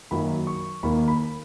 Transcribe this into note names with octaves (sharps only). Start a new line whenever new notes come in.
F#2 D#3 F#3 A#3 B5
C#6
D#2 D#3 A#3 B5
B5